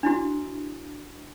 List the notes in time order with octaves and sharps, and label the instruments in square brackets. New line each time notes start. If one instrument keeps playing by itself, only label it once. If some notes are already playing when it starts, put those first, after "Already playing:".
[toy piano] D4 E4 F#4